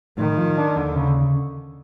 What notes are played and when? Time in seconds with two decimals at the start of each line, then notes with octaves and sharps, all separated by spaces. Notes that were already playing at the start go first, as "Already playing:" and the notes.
0.18 A2 D#3
0.37 F3
0.58 D4
0.76 D#2 D3
0.96 C#3